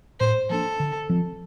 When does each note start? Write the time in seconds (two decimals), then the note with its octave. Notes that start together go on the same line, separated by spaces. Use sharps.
0.20 A2 C5
0.50 F3 A#3 D4 A4
0.80 D3
1.09 F3 C4